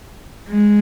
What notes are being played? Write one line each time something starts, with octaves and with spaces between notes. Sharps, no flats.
G#3